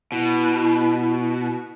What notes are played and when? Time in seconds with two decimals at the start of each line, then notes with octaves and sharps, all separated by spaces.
0.12 B2 E4